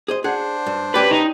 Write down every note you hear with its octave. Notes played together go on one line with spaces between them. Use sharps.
G#4 C5 D#5
D4 G#4 C5 F#5
G2
C#4 G4 B4 D5
D#4